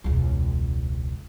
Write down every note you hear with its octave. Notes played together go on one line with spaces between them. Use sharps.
E1 C#2